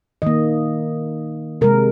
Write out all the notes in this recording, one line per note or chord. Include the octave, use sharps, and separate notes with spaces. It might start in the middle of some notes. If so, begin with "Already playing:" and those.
D#3 A#3 D#5
C3 G#3 A#4